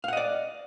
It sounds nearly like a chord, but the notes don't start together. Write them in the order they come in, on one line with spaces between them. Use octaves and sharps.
F5 F#5 D#5 D5